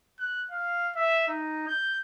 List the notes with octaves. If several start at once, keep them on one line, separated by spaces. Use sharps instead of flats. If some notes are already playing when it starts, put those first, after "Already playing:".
F#6
F5
E5
D#4
G6